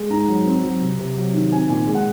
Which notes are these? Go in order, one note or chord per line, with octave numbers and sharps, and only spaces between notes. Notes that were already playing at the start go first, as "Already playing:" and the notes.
Already playing: G#3
G#2 A#5
F#3
C4
F#3
C3
C3
F#3
D#3
C4 G#5
A#2 G#5
G#3
F#5